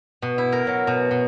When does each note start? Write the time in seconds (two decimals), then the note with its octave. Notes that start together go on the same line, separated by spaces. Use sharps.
0.22 B2
0.38 E4
0.52 A#4
0.67 F#3
0.87 B2
1.11 B2